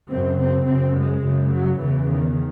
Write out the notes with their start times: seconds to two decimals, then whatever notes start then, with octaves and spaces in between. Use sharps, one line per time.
0.10 F#2 C#3 C4
0.40 C4
0.68 F#2 C#3 C4
0.97 G#3
1.25 F#2 C#3
1.53 F#3
1.82 E2 C#3 E3
2.10 D#3